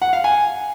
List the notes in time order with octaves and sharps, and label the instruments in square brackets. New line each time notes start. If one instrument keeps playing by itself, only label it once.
[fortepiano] F#5
F5
G#5